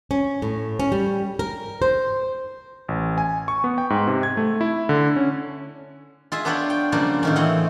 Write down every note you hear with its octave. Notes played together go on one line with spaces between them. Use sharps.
C#4
A2
C#4
G3
A#4
C5
A1
G#5
C#6
B3
G5
G#2
C3
G#6
A3
E4
D3
C#4
F4 G#4 E5
B3 D4 F4 B4 C#5 G5
G5
C#3 F3 G3 A#3 D4
A2 D#3 C#4
E3 C4 D#5 F#5